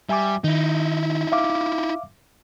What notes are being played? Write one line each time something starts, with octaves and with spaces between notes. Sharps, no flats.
G3 E5 G#5 D6
D#3 D#4 E4
E5 F5 D6